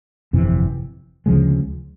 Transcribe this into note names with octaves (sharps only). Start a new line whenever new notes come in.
G1 F2 C3 E3
D2 C#3 F3 G#3